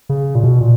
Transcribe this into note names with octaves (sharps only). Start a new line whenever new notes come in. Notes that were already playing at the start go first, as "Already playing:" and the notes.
C#3
A#2
B2
A#2